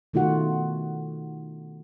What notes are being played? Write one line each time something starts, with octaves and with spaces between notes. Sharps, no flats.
B2 D#3 A3 F4 F#4 F#5